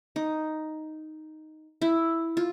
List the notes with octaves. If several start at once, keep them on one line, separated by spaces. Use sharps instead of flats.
D#4
E4
F4